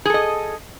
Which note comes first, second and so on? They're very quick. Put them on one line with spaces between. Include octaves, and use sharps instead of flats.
G#4 A4 D#5